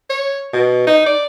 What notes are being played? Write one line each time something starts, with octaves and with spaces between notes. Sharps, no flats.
C#5
B2
D#4
D5